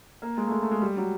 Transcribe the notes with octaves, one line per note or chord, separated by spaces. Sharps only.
A#3
G#3
A3
G#3
A3
G#3
G3
F#3